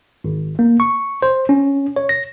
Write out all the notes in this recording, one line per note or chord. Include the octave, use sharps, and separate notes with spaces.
G#1
A#3
C#6
C5
C#4
C#5
A#6